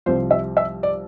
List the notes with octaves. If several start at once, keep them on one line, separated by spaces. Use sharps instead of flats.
C2 C3 F3 C5
E5
E5
D5